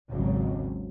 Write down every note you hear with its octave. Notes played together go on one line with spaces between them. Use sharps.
G#1 D#2 C#3 F#3